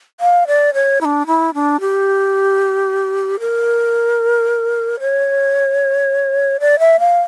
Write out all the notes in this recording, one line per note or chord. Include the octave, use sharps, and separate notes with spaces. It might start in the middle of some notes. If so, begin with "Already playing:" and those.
F5
D5
C#5
E4
D4
E4
D4
G4
A#4
C#5
D5
E5
F5